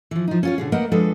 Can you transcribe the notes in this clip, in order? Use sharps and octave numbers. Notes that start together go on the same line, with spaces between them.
E3 F3
F3 D#4
C#4 F4 C#5
B2 D3 G#4
A3 A#3 A#4 B4 D#5 F#5
F3 G#3 D4 A4 B4 D#5